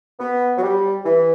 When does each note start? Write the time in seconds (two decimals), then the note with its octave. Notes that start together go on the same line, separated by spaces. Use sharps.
0.19 B3
0.57 F#3
0.63 G3
1.05 E3